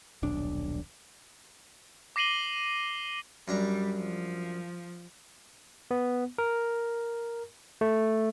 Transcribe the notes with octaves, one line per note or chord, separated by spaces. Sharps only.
D#1 B1 D4
D6 A#6 C7 D#7 F#7 G7
F#2 G3 D4 A#5
F3
B3
A#4
A3